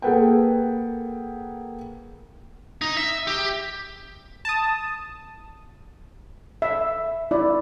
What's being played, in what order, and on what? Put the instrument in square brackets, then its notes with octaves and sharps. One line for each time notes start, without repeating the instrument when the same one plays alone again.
[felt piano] A#3 G#4 A4 B4 F#5 G5
[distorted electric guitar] D#4
E5
G4
[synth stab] A5 D#6
[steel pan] E5
E4 D5